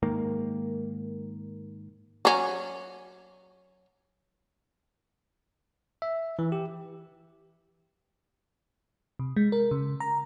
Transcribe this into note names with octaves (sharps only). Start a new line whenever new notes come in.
G#2 D#3 A#3
F#3 C#4
E5
E3
G4
C3
G#3
A#4
C#3
A#5